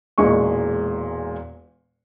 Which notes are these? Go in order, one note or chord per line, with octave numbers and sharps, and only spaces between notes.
E1 A#2 G#3 C#6